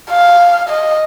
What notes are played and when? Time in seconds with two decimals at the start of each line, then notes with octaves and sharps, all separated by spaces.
0.10 F5
0.69 D#5